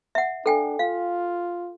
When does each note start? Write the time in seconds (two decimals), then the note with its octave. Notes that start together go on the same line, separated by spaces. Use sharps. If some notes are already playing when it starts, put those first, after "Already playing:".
0.15 E5 F#5
0.46 D4 A4 G5 G#5
0.79 F4 F5